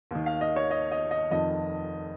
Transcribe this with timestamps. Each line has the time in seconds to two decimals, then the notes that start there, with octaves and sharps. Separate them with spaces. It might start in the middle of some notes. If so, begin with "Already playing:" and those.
0.11 D#2 D#3
0.26 F5
0.41 D#5
0.56 C#5
0.71 D#5
0.92 D#5
1.11 D#5
1.31 F1 F2 D#3 D#5